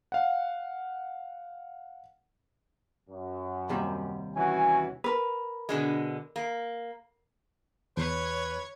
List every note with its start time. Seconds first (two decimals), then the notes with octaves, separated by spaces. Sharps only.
0.12 F5 F#5
3.10 F#2
3.69 D#2 C3 G3
4.36 E3 C#4 F#4 G#5
5.04 A#4 B4
5.69 B2 D3 G#3
6.36 A#3
7.97 E2 B4 C#5